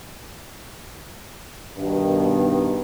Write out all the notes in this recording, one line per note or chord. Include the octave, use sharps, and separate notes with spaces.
G2 B2 D#3